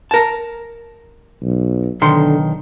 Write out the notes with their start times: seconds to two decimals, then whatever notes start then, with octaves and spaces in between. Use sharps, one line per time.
0.11 A#4 A5
1.42 B1
2.01 B1 D3 D#3 C6